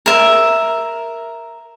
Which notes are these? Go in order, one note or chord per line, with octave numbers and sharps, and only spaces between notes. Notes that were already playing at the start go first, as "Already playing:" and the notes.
A#4 E5